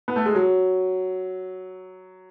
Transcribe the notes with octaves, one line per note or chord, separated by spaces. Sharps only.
B3
A3
G#3
F#3